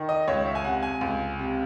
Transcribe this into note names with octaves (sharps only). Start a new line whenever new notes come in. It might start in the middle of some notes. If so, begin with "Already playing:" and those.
Already playing: D#3
D#5
C#2 C#5
E5
G#5
C3 F#5
G#5
C#2
C3